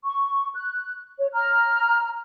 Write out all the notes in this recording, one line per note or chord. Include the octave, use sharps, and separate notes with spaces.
C#6
F#6
C#5
A#5 F6